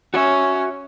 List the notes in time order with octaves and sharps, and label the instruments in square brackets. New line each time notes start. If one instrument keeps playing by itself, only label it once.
[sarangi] C#4 [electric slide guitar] F#4 C#5 E5